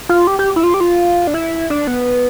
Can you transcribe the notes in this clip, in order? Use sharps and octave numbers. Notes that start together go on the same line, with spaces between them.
F4
G4
G4
E4
F4
G4
F4
D4
E4
D4
B3